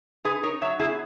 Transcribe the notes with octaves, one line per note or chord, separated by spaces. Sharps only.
D#4 G#4 B4
D#4 A#4 C#5
F#3 C#5 E5
B3 E4 G#4